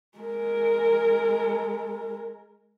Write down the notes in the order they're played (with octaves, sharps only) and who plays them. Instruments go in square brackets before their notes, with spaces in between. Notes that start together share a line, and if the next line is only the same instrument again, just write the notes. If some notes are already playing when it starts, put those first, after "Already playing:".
[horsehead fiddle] G#3 A#4